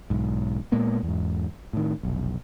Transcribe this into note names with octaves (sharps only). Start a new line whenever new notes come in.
B1 G#2
A#2 G#3 A#3 B3
E2 G#2
A2 D#3
F1 B1